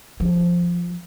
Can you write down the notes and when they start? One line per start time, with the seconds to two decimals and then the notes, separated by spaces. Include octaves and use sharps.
0.20 F3